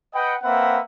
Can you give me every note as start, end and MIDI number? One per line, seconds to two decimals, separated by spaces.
0.14 0.34 71
0.14 0.34 75
0.14 0.34 78
0.14 0.34 79
0.43 0.79 58
0.43 0.79 60
0.43 0.79 71
0.43 0.79 76
0.43 0.79 78